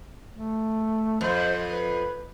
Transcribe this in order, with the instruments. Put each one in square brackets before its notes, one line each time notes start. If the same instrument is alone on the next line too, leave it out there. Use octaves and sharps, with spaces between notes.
[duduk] A3
[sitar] F2 [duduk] C5
[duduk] B4